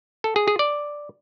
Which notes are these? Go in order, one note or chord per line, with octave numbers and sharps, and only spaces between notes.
A4
G#4
G#4
D5